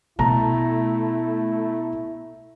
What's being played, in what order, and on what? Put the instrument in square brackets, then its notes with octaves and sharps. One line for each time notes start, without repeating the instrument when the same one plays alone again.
[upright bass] B2 [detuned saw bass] A3 [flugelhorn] E4 [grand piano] A5 A#5